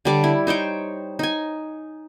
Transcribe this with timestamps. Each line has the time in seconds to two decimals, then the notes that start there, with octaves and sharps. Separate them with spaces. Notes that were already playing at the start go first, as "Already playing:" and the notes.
0.05 D3 G3 D5
0.24 E4
0.47 D#4 C5 C#5 G5
1.19 D#4 G#5